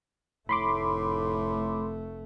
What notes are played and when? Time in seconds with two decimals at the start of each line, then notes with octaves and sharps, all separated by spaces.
0.49 F1 A2 A3 B5 C6 D6